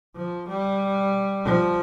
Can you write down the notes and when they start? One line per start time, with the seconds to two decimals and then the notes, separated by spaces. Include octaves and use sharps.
0.15 F3
0.48 G3
1.45 F3